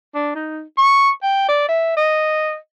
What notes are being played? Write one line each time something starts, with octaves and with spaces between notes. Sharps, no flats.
D4
D#4
C#6
G5
D5
E5
D#5